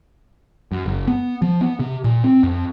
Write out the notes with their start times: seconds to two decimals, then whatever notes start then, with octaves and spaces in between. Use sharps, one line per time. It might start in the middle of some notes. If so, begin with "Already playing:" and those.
0.72 F#2
0.86 F#1
1.08 B3
1.42 F3
1.61 B3
1.80 C3
2.04 A#2
2.24 C4
2.43 F2